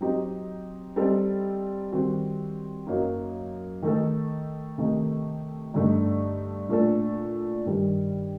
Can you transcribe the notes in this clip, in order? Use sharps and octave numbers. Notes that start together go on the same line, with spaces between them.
F#3 C4 D#4 G4
G3 C4 D#4 A4
D#3 G3 C4 F#4
F#2 F#3 A#3 D#4
D#3 A3 D#4 A4
C3 D#3 A3 D#4
G2 D3 A3 D#4
A#2 A3 D4 A4
G2 D#3 G3